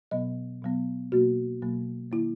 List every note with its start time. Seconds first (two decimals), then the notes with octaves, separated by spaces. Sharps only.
0.11 B2 F#3 B3 D#5
0.62 B2 F#3 B3
1.12 B2 F#3 A#3 F#4
1.62 B2 F#3 A#3
2.12 D#3 A#3 E4